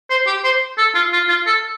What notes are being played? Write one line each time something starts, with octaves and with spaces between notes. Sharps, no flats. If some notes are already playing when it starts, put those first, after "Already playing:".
C5
G4
C5
A4
F4
F4
F4
A4